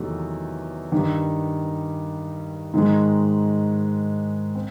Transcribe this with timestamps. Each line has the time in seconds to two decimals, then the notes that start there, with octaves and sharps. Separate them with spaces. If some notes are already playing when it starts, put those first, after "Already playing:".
Already playing: E2 C3 D#3 F#3 A3
0.92 G2 D#3 G3
2.74 G#2 D#3 G#3
4.55 C4